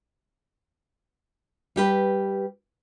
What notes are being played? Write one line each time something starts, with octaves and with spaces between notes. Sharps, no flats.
G3 G4 B4